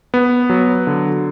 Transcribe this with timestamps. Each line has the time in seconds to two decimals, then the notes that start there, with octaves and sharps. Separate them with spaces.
0.14 B3
0.50 F#3
0.87 D3